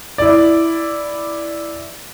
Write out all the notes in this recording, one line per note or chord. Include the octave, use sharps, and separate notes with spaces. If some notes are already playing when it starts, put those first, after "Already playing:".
E4 D5